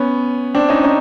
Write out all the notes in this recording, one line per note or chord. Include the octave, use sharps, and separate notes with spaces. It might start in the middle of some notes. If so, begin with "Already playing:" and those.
Already playing: B3 C#4
C4 D4
C#4 D#4
C#4 D#4